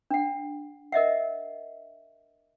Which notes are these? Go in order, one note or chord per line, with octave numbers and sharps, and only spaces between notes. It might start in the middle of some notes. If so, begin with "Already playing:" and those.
D4 F#5
A#4 D#5 E5 F#5